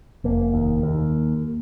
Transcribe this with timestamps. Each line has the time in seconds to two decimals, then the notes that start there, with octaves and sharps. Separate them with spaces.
0.24 F1 A#3
0.54 D#2
0.83 D#2